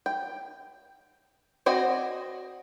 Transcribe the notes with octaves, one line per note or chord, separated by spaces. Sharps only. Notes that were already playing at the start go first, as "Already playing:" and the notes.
G5
C4 F#4 D5 D#5 G#5